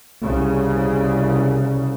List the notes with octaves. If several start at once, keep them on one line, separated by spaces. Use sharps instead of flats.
C2 C#3